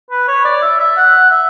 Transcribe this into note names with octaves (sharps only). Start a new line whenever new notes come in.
B4
C#5
D5
E5
E5
F#5
E5